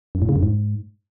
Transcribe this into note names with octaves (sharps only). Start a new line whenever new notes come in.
F#2
A2
C#3
F#2
G#2